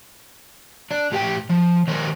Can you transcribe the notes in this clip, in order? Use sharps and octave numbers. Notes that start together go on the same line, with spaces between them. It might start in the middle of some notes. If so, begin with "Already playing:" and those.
D4 D5
A2 G4 F#5 G5
F3
D#3 A#3 D4 A#4 C5